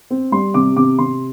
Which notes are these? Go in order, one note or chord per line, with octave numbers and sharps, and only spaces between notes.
C4
G3 C6
C3 D6
C3 D6
C3 C6